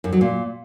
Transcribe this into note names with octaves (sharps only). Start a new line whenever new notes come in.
F#2
F#3
A#2